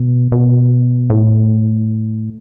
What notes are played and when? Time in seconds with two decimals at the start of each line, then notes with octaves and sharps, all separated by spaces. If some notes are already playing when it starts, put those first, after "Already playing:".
Already playing: B2
0.32 B2
1.10 A2